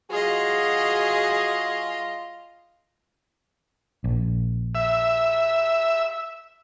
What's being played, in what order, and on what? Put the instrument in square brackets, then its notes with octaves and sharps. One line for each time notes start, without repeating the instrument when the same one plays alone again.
[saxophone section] F#3 F#4 G#4 [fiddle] F4 D#5
[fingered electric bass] A#1
[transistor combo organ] E5